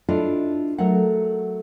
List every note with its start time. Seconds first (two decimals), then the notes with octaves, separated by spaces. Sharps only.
0.09 D4 E4 F4 A4 D5 D#5
0.78 F#3 A3 A4 A#4 F#5